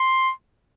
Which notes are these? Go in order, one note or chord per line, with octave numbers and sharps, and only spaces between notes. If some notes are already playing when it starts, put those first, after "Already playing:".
Already playing: C6